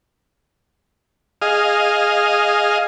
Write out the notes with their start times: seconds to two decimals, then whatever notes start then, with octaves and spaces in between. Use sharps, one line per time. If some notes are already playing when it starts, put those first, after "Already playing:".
1.42 G#4 D#5 F5